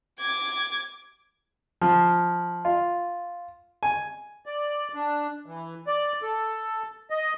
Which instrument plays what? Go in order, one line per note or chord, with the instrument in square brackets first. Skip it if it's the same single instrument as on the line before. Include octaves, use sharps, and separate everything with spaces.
[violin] D6 G#6
[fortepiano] F3
F4
G#5
[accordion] D5
D4
E3
D5
A4
D#5